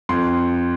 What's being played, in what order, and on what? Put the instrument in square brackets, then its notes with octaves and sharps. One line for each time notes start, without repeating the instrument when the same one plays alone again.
[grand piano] F2 C6